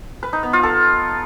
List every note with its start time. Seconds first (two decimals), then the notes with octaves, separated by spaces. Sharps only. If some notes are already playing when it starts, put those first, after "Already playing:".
0.23 B4
0.33 D#4
0.43 B3
0.53 F4
0.63 A4